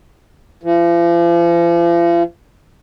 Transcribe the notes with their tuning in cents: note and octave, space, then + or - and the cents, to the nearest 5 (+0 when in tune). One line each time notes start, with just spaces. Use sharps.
F3 -40